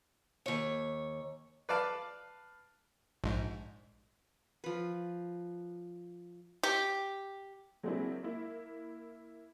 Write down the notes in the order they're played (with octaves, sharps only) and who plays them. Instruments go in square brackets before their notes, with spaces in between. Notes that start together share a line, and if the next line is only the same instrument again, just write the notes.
[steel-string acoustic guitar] D#2 C#5
[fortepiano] B4 D5 F5 A5 D6
[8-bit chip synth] A#1 G#2
[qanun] F3 B4
[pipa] G4
[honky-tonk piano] F#3 G#3 A#3 C4 D4 E4
A#3 E4